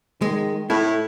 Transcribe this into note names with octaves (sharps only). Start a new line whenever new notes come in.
D#3 G#3
A2 E4 A4